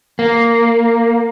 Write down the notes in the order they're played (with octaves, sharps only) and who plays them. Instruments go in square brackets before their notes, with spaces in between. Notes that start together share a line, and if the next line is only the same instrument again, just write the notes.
[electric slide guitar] A#3